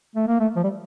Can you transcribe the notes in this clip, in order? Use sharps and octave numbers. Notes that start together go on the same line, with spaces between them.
A3
A#3
A3
F3
G3